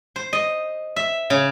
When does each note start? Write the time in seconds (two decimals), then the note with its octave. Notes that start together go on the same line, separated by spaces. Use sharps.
0.16 C5
0.33 D#5
0.96 E5
1.30 C#3